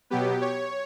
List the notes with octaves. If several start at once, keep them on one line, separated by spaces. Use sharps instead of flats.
B2 F#3 B3 G4
C#5